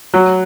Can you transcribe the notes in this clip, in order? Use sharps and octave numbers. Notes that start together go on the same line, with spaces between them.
F#3